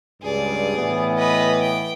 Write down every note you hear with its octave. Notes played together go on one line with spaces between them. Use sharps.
C#2 G2 G#4 D5
A2 E3 B3
B4 D#5
G5